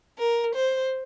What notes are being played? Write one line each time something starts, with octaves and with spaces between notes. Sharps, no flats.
A#4
C5